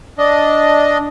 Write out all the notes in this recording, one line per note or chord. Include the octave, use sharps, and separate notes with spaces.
D4 D#5